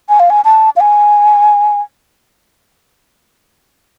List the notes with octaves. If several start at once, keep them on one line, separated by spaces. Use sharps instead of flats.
G#5
F5
G#5
A5
F5
G#5